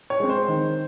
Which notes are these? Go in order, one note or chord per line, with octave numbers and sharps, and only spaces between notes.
C#5
G#3 C4
C5
D#3